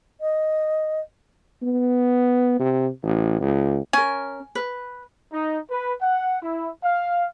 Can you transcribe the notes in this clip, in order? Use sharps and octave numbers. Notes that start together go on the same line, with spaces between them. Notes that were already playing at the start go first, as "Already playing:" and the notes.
D#5
B3
C3
A1
C#2
C#4 A#4 G#5
B4
D#4
B4
F#5
E4
F5